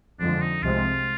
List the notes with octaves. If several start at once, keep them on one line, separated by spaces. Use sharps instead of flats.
F2 D3 F3 G#3 D4
D#4
C2 C3 F3 G#3 C4 F4